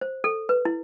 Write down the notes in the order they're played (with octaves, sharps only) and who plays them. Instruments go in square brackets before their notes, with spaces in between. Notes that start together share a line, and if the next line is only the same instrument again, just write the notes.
[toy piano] C5
A4
B4
E4